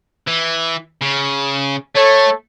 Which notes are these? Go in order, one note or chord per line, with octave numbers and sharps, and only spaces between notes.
E3
C#3
A3 A4 C#5